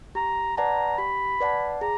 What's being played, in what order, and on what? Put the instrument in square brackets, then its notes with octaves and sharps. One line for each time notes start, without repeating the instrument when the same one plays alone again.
[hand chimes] G4 [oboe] A#5
[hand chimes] B4 D5 F#5 A5 [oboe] A#5
[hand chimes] G4 [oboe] B5
[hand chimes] B4 D5 F#5 A5
[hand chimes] G#4 [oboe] A#5